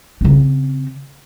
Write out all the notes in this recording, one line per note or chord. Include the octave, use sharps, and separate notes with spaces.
C#3 C4